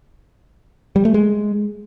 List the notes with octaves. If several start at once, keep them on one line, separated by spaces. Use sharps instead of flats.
G3
A3
G#3